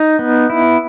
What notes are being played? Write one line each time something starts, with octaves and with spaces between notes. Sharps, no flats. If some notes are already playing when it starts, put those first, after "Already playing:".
Already playing: D#4
B3
E4